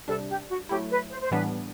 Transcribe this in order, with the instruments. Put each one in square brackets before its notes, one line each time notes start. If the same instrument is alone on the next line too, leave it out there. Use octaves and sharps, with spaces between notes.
[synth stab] C3 G3 D4 [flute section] A4
[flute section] G4
F#4
[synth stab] F#3 A3 E4 [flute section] G4
[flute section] B4
C5
C5
[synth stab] A2 E3 G3 B3 D4 [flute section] B4